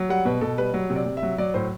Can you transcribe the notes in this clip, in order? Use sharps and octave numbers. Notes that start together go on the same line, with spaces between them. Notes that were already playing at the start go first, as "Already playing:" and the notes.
Already playing: F#3
G3 F#5
B2 B4
B2 A4
G3 B4
F#3
C3
D5
C3
E5
F#3
F#3 D5
A2 C5